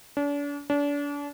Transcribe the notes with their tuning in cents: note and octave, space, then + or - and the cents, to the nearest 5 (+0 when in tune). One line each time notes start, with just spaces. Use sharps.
D4 -40
D4 -35